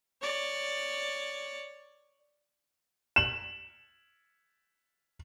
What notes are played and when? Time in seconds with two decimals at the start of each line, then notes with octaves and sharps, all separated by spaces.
0.22 C#5 D5
3.16 E7 F#7